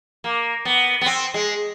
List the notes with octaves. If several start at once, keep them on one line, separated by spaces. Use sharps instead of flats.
A#3
B3
B3
C4
G#3